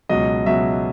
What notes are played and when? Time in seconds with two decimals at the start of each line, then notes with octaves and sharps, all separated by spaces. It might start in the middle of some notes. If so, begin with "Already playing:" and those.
0.09 C#2 B2 F#3 D#5
0.46 C#2 B2 F#3 E5